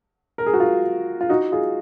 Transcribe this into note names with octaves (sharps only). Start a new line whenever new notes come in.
A#4
G#4
F#4
F4 G#4
F4
D#4 F#4
F4 G#4